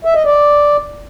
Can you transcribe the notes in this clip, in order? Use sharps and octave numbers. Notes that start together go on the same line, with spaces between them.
E5
D#5
D5